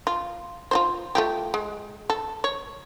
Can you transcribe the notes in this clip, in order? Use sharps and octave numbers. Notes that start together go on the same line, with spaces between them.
F4
F4 F#4 C5
A3 F4 G4
G#3
A4
C#5